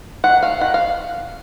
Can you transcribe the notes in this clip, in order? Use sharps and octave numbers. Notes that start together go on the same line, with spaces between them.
D#3 F#5
A3 F5
D#3 F#5
F5